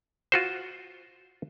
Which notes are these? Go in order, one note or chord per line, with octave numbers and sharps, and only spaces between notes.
F4 F#4 C5